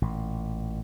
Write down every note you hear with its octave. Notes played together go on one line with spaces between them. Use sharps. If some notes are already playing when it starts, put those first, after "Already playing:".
A1 A#2